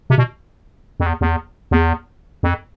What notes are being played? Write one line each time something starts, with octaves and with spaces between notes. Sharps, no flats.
C3
B2
F2
E2
E2
E2
F2